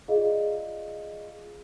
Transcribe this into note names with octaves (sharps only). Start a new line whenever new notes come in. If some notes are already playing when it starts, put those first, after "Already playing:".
F4 G#4 D5 D#5 F5